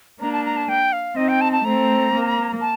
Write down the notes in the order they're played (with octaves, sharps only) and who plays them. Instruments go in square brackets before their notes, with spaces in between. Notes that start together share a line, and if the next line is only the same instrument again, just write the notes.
[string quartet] A#3 D4 [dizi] A#5
[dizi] A5
A#5
A5
G5
F5
[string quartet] C4 D#4 [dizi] D#5
[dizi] G5
A5
A5
[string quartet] A3 C4 [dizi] A#5
[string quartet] A#3
[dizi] A5